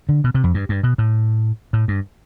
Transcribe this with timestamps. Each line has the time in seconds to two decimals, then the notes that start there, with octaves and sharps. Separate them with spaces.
0.09 D3
0.24 B2
0.34 C3
0.44 F2
0.54 G2
0.69 G2
0.83 B2
0.98 A2
1.73 A2
1.88 G2